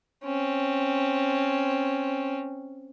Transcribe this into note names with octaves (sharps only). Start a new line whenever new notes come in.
C4 C#4